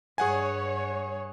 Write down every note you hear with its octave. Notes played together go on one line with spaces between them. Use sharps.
G2 G#4 C#5 F#5 G#5